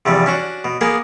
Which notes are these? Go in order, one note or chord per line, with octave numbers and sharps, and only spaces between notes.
E2 C3 F3 G3
C#4 D4 F#4
B2
A#3 B3 G#4